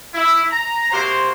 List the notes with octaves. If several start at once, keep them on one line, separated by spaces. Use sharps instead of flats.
E4
A#5
C3 A#3 F#4 C5